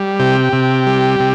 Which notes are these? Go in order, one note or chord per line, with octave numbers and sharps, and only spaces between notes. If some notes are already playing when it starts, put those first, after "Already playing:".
Already playing: G3
C3 G4
C3
G3
C3